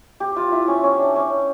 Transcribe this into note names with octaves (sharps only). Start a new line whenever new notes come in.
G4
F4
E4
C#4
C#4
D4
C#4